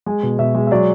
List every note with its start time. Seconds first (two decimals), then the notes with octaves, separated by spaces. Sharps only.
0.06 G#3 G#5
0.23 B2
0.39 B2 E5
0.55 G#3
0.67 E5
0.71 F#3 D5